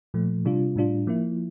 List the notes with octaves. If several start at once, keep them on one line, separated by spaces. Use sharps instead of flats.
A#2 F3 A3
C3 G3 D4 F4
A2 G3 D4 F4
F3 A#3 E4